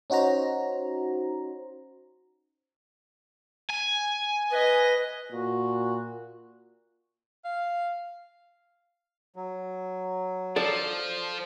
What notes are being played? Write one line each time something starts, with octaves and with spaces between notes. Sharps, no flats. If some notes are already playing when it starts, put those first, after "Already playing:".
C#4 D#4 F#4 C5 A#5
G#5
B4 D#5
A#2 F#4
F5
F#3
F3 A4 D5